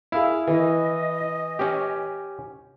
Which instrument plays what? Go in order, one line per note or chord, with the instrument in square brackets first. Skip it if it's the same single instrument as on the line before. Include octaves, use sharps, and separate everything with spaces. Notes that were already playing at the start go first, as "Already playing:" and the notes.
[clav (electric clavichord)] E4 [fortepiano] G#4 F5
[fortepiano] E3 [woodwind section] D#5
[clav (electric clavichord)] C#4 G4